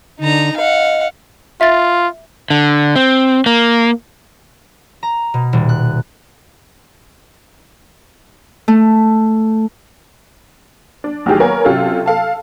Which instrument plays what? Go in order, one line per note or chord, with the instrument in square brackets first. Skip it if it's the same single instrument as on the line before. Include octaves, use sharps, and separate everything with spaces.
[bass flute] D3 [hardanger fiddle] D#4 A#5
[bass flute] D#5 [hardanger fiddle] F5 F#5
[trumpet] F4 [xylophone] E5 A6
[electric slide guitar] D3
C4
A#3
[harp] A#5
B2
D#1
F#6
A3
[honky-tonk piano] D4
A1 D#3 F#3 G4 G#4
A#3 B3 A#4 C#5 G#5
C3 F#3 C#4 F4 G4 A4
A4 F5 A5